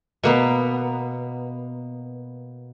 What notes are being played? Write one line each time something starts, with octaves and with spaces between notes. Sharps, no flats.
B2 A#3 B3